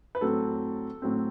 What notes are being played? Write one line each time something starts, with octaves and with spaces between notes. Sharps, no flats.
B4
A2 F#3 C4 A4
A2 F#3 C4